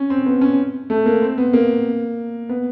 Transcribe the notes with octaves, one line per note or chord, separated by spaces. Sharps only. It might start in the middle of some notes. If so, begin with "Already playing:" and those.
Already playing: C#4
C4
B3
C#4
A3
A#3
C4
B3
A#3
B3